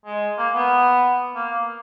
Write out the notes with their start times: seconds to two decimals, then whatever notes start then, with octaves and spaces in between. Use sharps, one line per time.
0.06 G#3
0.38 A#3
0.55 B3
1.35 A#3